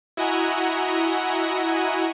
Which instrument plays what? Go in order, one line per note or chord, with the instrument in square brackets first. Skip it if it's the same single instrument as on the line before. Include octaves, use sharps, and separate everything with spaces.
[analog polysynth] E4 F#4 D#5 F#5 G#5 A#5